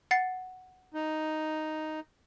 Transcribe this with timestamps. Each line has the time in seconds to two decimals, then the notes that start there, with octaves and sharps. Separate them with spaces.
0.11 F#5 A6 C7
0.94 D#4